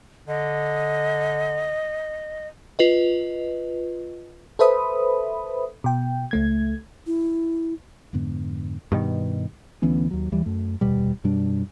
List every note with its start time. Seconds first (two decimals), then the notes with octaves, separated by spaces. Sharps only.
0.28 D3 D#5
2.79 F4 B4 D#5
4.59 A4 B4 C5 E5 B5 D#6
5.84 B2 G5
6.31 C#2 A3 G#6
7.06 E4
8.13 F2 G#2 D3 B3
8.92 G2 B2 D#3
9.82 D2 E3 B3 C#4
10.11 D#2 F#3
10.32 D#2 E3 G3
10.46 F#2 A3
10.81 F1 D#2 B2 G3
11.24 F#2 B2 G3 D4